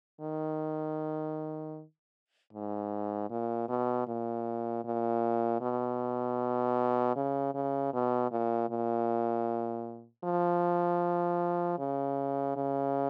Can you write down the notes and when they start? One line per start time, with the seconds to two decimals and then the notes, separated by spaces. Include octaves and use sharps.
0.21 D#3
2.53 G#2
3.30 A#2
3.69 B2
4.07 A#2
4.84 A#2
5.61 B2
7.16 C#3
7.54 C#3
7.93 B2
8.31 A#2
8.70 A#2
10.24 F3
11.79 C#3
12.56 C#3